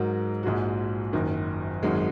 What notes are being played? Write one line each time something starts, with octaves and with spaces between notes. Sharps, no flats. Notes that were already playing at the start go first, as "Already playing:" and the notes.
Already playing: G#2 F#3 D#4 F#4 A#4
A#1 G#2 G#3 F#4
F#1 F#2 D#3
G#1 F#2 D#3 G#3 F#4